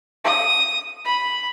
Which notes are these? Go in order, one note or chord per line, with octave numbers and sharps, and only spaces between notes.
D#6
B5